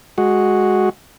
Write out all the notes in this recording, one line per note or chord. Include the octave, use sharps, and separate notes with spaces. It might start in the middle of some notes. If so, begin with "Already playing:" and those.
G#3 F#4